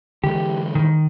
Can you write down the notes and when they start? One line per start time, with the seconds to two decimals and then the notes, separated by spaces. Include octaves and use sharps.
0.24 D3 E3 G#3 G4
0.75 D#3